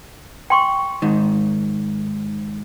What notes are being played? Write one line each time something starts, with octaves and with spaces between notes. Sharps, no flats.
G5 C6 C#6
G#2 D#3